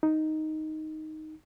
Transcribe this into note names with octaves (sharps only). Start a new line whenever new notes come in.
D#4